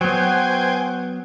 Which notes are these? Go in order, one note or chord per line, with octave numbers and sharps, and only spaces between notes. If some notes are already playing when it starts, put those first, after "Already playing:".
F#3 B3 C5 G5 G#5